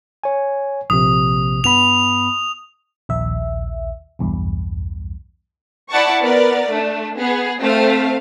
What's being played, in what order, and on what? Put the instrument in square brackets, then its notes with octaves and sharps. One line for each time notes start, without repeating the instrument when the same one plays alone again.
[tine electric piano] C#5 G#5
[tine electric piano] A#1 C3 [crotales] D#6
[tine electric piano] G2 B3 B5 [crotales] F7
[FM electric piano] A#1 D#2 E5
B1 E2 G2
[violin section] E4 D5 F#5 A5 C#6
B3 A#4 D5
A3 D4
B3 G#4
A3 C4 F5